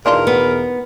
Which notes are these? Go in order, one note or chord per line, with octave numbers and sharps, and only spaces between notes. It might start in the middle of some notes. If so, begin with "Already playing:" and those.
E2 B2 D#3 D4 F4 A#4
B3